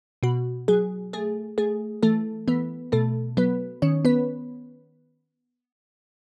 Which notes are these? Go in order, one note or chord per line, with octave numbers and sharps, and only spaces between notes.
B2 F#4
F#3 G#4
A3 G#4
A3 G#4
E3 A3 A4
E3 B3 B4
B2 A3 A4
F#3 B3 B4
D#3 C#4 C#5
B3 B4